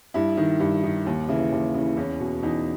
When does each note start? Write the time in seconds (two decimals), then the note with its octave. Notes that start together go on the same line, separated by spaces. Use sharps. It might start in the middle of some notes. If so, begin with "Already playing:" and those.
0.14 G2 E4
0.37 D#3
0.60 G2
0.84 D#3
1.06 D#2
1.28 C#3 E3 E4
1.52 D#2
1.74 C#3 E3
1.97 E2 C#4
2.20 B2
2.43 E2 D#4